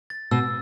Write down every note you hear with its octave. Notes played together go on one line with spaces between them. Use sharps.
A6
B2 E6